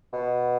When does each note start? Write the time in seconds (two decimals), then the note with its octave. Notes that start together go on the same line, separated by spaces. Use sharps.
0.13 B2